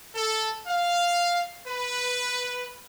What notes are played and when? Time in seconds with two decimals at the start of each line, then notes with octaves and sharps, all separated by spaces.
0.15 A4
0.68 F5
1.68 B4